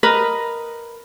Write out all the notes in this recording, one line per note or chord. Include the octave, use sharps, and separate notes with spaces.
A#4 B4 D#5